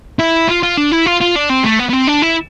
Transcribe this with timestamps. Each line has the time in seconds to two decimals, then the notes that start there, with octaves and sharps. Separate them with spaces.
0.19 E4
0.49 F4
0.63 F4
0.77 D4
0.91 E4
1.06 F4
1.21 F4
1.35 D4
1.49 C4
1.64 A3
1.79 B3
1.89 B3
1.93 C4
2.07 D4
2.22 E4